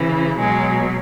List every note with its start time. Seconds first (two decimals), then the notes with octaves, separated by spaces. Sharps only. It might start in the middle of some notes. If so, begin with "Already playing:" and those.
Already playing: C#3 E3
0.39 B2 F#3 G#3